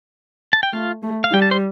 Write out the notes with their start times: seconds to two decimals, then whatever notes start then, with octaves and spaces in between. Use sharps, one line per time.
0.53 A5
0.63 G5
0.73 A3 F4 F5
1.03 A3
1.24 F5
1.32 G3 G5
1.42 A5
1.51 C5 C6